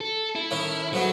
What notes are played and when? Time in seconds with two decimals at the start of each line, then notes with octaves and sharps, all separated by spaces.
0.01 A4
0.35 E4
0.51 A2 D#3 C#4
0.93 G#2 F#3 A3 B3